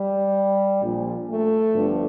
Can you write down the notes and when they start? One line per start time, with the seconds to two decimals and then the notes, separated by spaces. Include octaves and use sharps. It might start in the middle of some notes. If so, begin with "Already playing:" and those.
Already playing: G3
0.82 A#1 A#2 F3
1.28 A3
1.73 G1 G2 D3 F3